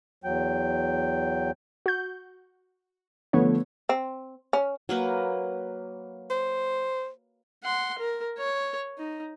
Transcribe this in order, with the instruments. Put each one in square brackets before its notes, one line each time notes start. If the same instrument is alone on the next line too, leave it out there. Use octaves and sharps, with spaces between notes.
[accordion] E2 F#3 G5
[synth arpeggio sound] F#4 G6
[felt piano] D3 F3 A3 [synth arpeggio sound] B3 C#5
[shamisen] C4
C#4
[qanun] F#3 A#3 B4
[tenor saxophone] C5
[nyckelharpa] F#5 C6
A#4
C#5
D#4